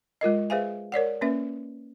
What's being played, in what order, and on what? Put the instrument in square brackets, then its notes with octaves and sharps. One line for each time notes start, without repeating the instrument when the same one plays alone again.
[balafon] G#3 F4 A#4 D#5
G#4 B4 C5 E5 F5 G#5
A#4 C#5 D5 F#5
A#3 C#4 B4 E5